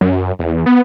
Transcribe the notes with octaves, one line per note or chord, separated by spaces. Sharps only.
F#2
E2
B3